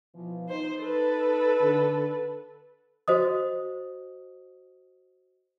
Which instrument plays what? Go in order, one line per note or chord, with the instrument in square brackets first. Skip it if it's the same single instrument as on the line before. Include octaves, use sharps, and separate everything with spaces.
[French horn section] B2 E3 F3
[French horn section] D#4 [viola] C5
[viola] A4 B4
[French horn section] D3
[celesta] F#4 C5 D#5 D#6